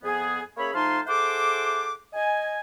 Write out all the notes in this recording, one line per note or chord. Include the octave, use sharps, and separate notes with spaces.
F2 B3 G#4
A#3 C#4 G#4 C#5 E5 B5
F3 A3 D#4 F5 A5 C6
E4 G#4 A4 C5 F#5 D6
D#5 G#5